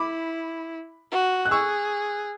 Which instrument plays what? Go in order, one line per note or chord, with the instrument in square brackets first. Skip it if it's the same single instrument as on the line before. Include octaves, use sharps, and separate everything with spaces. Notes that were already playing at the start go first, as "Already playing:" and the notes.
Already playing: [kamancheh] E4 [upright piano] B5 D6
[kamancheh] F#4
[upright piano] F#6
[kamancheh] G#4 [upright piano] C#6 E6